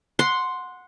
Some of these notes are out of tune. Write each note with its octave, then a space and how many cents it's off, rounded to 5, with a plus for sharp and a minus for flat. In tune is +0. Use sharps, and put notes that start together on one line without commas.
F#5 -15 C6 +0